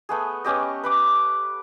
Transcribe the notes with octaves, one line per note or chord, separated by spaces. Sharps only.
A3 B3 G#4
B3 C#4 G4 D#5
B4 B5 D6